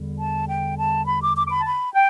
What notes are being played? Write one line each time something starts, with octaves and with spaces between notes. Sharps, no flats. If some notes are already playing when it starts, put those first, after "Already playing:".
Already playing: E2 D3 G3
A5
G5
A5
B5
D6
D6
D6
B5
A5
B5
G5